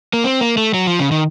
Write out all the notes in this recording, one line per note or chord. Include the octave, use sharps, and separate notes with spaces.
A#3
C4
A#3
A3
F#3
F3
C#3
D#3